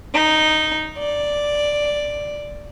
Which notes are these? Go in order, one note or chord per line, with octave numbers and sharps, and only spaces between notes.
D#4
D5